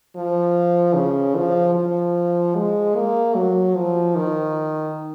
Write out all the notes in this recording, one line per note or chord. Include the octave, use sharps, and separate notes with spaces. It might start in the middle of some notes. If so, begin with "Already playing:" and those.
F3
C#3
F3
F3
G#3
A#3
F#3
F3
D#3